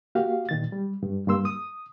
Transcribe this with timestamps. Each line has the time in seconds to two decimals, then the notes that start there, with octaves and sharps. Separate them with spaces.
0.15 A#3 F#4 G4 F5
0.49 A#2 D#3 A6
0.72 G3
1.03 G2
1.28 G2 A#3 C6 E6
1.45 D#6